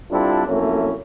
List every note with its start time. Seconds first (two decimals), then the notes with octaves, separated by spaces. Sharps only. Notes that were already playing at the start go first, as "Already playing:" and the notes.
0.11 G3 C4 D4 E4 F4 A4
0.47 F2 F#3 A3 A#3 C#4 E4